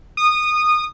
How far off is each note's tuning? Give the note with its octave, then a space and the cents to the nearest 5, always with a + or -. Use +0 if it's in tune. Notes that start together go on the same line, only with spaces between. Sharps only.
D#6 -20